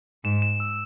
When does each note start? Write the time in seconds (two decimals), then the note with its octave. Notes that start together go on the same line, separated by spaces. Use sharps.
0.24 G#2 E7
0.42 E7
0.60 E6